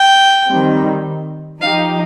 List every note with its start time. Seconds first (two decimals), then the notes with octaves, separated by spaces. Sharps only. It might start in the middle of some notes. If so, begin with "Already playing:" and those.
Already playing: G5
0.48 D#3 G3 C4
1.61 F3 D#4 G4 F5